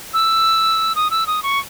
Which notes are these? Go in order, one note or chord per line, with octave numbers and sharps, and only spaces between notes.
E6
D#6
E6
D#6
C#6